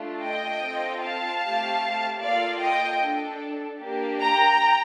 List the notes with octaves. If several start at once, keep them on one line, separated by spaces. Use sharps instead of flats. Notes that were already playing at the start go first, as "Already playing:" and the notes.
Already playing: A3 D4 F4 A4
D#5 G5
C4 F4 A4
F5 A5
A3 C4 G4
A#3 F4 A4 D5 F5
D#5 G5
D4 A4
A#3 D4 G4
G5 A#5